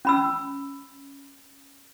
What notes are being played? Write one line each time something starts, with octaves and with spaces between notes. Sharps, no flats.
C#4 B5 E6